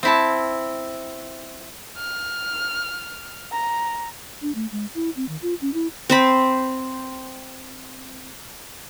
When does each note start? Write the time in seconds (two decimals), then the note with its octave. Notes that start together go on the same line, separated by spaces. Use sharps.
0.03 C4 E4 A5
1.97 F6
3.51 A#5
4.42 D4
4.55 A3
4.72 G#3
4.95 E4
5.16 C4
5.29 D#3
5.42 F4
5.61 C#4
5.74 E4
6.10 C4 C5 B5